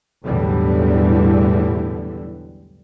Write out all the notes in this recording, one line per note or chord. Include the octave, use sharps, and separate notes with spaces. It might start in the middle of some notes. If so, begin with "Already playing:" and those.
B1 E2 A2 D3 E3 G3